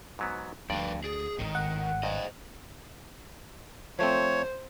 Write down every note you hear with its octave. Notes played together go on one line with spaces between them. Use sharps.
G#2 F#3 B3
D2 G2 F3 B4 D5
G#4 D5
G#1 A2 D#3
F#5
G2 C5 D#5
F3 A3 C4 C5 C#5